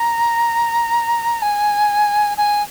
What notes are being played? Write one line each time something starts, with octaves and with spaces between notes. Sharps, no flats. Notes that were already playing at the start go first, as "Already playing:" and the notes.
Already playing: A#5
G#5
G#5